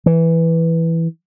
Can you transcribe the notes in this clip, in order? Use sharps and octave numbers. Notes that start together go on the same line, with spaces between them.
E3